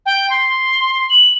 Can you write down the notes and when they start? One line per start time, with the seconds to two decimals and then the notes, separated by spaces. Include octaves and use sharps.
0.06 G5
0.30 C6
1.10 F#7